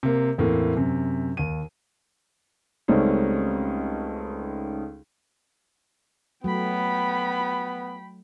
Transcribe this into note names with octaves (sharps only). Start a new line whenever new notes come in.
C3 A#3
E2 A2 A#3 C4
F#2 C3
D#2 D#7
C#2 G3 A3 C4 C#4 D#4
F#3 A3 B3 G5 B5